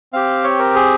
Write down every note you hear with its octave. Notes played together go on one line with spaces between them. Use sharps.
C4 G4 F5
C#5
A#4
G#4